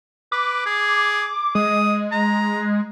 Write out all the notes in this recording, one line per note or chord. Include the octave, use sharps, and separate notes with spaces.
B4 D6
G#4
G#3 D#6
A#5